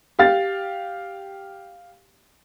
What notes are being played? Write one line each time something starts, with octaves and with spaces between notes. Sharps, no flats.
G4 F5 A6